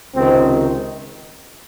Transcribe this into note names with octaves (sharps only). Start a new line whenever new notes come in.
C#2 C3 D#3 C4